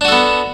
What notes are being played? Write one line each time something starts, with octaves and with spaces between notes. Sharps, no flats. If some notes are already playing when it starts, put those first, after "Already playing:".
B3 D4 F#4 A4